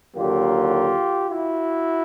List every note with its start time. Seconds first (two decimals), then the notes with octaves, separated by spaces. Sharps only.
0.16 D#2 D3 F#3 A#3 F4 G4
1.30 E4 F#4